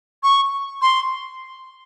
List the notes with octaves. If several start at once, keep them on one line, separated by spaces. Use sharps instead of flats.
C#6
C6